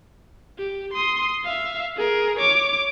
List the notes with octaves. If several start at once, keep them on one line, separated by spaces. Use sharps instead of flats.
G4
C6 D#6
E5 F5
G#4 A#4
C#5 D6